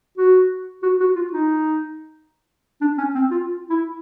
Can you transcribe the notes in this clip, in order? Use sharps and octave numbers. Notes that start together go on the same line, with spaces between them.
F#4
F#4
F#4
F4
D#4
D4
C#4
C4
F4
E4